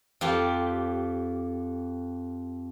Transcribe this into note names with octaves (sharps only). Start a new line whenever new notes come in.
F2 F4 G4